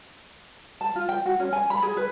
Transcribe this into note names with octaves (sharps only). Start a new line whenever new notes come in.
A5
F4
G5
F#4
C#4
G#5
B5
G#4
B4